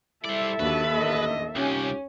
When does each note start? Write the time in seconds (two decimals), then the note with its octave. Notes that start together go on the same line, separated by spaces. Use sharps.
0.25 G3 E4 A4 C5 D5 E5
0.60 D#2 D4 F#4 B4
0.96 A1 D3 D#5
1.56 C2 C#4 D#4 F4 G4